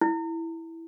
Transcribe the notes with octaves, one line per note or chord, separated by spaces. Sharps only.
E4